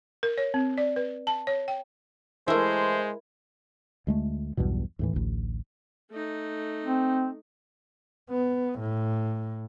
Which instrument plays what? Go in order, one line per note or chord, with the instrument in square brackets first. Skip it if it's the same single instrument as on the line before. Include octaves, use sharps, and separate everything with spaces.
[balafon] A#4
C#5
C4
D5
B4
A5
C#5
G5
[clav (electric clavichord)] E3 A3 [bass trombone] G#3 [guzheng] E4 A#4 [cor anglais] C5
[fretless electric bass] D2 G#3 A3
B1 E2 G2 B2
D#2 A2 E3
A1 D2
[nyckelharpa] A3 D#4
[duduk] C4
[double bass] B3
A2